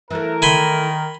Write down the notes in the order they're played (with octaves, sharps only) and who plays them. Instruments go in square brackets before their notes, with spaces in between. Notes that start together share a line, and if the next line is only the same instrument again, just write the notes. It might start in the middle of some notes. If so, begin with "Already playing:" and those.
[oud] E3 A3 [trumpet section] A#4
[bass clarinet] D#3 [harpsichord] G#5 B5 C6